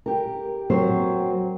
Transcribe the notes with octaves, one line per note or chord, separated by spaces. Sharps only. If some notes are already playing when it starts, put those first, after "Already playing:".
G4 A#4
F#3 C4 A#4 C5